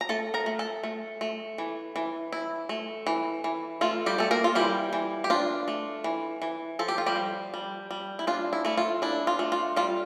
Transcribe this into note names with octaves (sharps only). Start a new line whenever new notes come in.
A#5
A3 A4 A5
A#4 A#5
A3
A4 A5
A3
A3
E3
E3
E4
A3
E3
E3
A3 F4
G3 G4
A3 A4
A#3 A#4
F4
E3 G3 G4
E3
G4
D4 F4
A3
E3
E3
F3 A4
G4
F4
G3 G4
F3
G3
G3
E4
D4 F4
E4
A3 E4
F4
D4 E4
F4
A3
F4
G3 F4